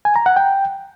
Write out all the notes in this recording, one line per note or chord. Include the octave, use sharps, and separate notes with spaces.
G#5
A#5
F#5
G5